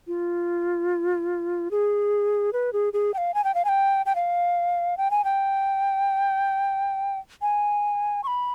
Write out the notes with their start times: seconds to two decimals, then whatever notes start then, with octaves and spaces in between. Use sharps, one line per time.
0.08 F4
1.71 G#4
2.53 B4
2.73 G#4
2.93 G#4
3.14 G5
3.18 F5
3.34 G#5
3.44 G5
3.55 F5
3.65 G#5
3.69 G5
4.06 G5
4.15 F5
4.97 G5
5.11 G#5
5.24 G5
7.42 G#5
8.24 C#6
8.27 B5